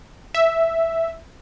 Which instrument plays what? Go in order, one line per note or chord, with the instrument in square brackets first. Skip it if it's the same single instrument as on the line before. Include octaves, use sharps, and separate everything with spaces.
[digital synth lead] E5